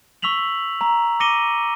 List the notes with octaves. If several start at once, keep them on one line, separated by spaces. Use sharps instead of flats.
C#6 E6 B6 F7 F#7
A#5
D6 A#6 C#7 D#7 G7